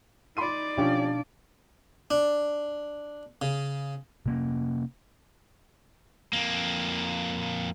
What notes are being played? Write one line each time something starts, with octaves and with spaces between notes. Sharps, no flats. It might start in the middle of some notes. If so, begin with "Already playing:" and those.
D#4 D5 B5 C6 D#7
B2 F3 C#4 D4 G4 F5
D4
C#3
C3 A#3 C#4
F2 A#3